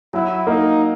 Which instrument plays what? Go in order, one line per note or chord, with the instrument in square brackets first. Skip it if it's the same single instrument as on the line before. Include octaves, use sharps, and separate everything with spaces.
[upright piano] F#3 [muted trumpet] E4
[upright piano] A#3 [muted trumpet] D#4